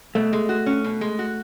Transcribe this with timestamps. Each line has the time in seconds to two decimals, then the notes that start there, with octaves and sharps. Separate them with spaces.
0.15 B2 A3
0.33 G#3
0.49 F#4
0.66 C#4
0.84 B2
1.01 G#3
1.19 F#4